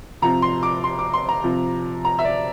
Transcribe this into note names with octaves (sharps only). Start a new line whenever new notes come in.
C3 F3 A#5
C6
D6
C6
D6
C6
A#5
C3 F3
A#5
E5
D5